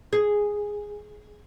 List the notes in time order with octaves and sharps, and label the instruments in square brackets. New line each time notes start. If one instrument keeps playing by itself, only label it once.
[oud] G#4